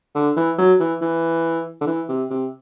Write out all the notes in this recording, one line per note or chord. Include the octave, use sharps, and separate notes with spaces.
D3
E3
F#3
E3
E3
D3
E3
C3
C3